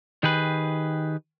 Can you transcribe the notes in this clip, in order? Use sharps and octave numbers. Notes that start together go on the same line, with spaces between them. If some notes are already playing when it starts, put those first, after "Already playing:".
D#3 G4 G#4 B4